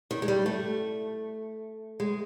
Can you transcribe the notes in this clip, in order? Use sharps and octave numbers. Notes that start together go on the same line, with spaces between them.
D#3
G#3
G3
A3
G#3